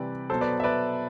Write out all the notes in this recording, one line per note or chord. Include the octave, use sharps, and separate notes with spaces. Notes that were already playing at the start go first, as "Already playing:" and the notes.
Already playing: C3 E3 G3 B4 D5
B2 F#3 A4 C5
B4 D5
E5
B4 D5